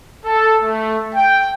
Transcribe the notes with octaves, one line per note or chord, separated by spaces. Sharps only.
A4
A3
G5